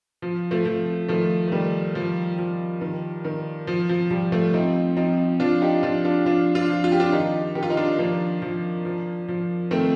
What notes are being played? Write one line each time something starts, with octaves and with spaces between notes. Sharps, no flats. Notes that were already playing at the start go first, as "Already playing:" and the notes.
F3
F3 A3
F3
D#3 F3 A3
A3
D#3 G3
F3
F3
D#3
D#3
F3
F3
F3 G3
F3 A3
F3 C4 D#4
F3 C4 D#4
F3 D4 F4
D#4 G4
F3 D4 F4
D4 F4
F3 D4 F4
D4 F4
F3
F4
G4
D4 F4
D#3 D#4 G4
D#3 G4
F4
D#4
D4 F4
F3 A#3 D4
F3
F3
F3
D#3 A3 C4